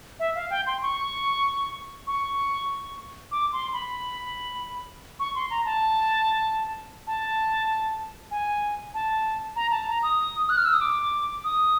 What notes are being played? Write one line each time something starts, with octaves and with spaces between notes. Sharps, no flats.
E5
F5
G5
C6
C#6
C#6
D6
C6
B5
C#6
C6
A#5
A5
A5
G#5
A5
A#5
A5
A#5
D#6
F#6
F6
E6
D#6
D6
D#6